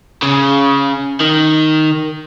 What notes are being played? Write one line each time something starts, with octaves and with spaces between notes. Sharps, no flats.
C#3
D#3